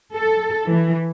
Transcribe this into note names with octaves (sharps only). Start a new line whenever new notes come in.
A4
E3